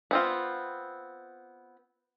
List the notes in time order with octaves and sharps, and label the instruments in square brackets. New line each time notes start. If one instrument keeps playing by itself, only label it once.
[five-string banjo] B3 C4 F4